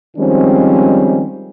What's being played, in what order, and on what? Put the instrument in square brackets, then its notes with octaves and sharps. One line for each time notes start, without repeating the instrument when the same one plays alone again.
[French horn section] D#3 F3 G3 G#3 C4 C#4